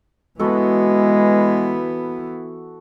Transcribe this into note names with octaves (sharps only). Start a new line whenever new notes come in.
E3 G#3 B3 F#4 A4